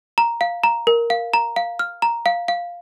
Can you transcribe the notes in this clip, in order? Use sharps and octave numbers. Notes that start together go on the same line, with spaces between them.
A#5
F5
A#5
A#4
F5
A#5
F5
F6
A#5
F5
F5